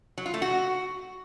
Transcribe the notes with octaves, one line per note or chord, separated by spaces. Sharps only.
F#3
F4
A3
F#4